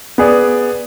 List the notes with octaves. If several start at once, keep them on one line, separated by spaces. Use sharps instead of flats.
B3 G#4 D5